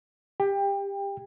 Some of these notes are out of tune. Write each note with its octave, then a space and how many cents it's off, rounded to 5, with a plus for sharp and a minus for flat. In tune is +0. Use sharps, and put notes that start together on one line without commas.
G4 +20 G5 +25